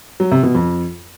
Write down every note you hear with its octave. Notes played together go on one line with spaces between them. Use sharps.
F#3
C3
B2
F2